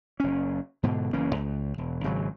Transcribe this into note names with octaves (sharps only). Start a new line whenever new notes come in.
F#1 C#4
G#2 B2 D3
F#1 E3 A#3 C#4
C#2
E1
G#1 C#3 F#3